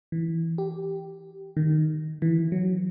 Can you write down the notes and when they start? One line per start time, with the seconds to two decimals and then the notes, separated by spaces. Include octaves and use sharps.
0.12 E3
0.58 G4
1.57 D#3
2.22 E3
2.52 F#3